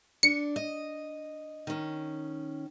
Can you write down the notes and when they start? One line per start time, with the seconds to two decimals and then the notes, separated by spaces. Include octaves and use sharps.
0.23 D4 C#7
0.56 D#5
1.67 D#3 C#4